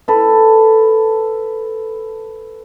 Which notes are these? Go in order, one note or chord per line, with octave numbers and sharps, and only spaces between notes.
A4 B4